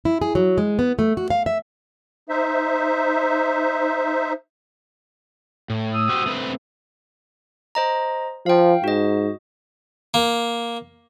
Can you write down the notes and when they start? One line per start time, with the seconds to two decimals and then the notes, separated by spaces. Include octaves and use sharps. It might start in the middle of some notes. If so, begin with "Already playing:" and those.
0.05 E4
0.22 G#4
0.35 F#3
0.58 G#3
0.79 B3
0.99 A3
1.17 F#4
1.30 F5
1.46 E5
2.29 D#4 C5 E5
5.70 A2
5.93 D#6 E6
6.09 F#4 G4 C5
6.26 A3 C4 B4
7.75 C5 D#5 A#5
8.46 F3 F5 G5
8.84 G#2 F#4 D#5
10.14 A#3